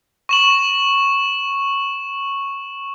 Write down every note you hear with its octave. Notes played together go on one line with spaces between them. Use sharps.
C#6 E7 F#7